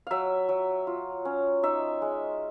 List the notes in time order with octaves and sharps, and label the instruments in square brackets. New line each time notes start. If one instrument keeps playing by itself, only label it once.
[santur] F#3 E5 F5
F#3
F4
C#4
D#4 E5
G#3